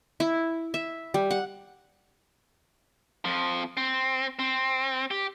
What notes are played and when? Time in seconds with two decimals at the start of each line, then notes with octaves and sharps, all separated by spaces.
0.20 E4
0.74 E5
1.14 G3
1.31 F#5
3.25 F2 F3
3.77 C4
4.39 C4
5.11 G4